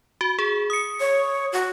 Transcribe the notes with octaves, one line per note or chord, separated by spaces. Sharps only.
F#4
G#4
D#6 C#7
C#5
F#4